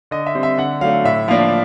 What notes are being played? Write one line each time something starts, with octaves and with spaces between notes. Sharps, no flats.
D3 D#5
E5
G3 C4
E5
D3 F#5
F#3 A3 D4 F5
A2 E5
F3 A#3 D4 F5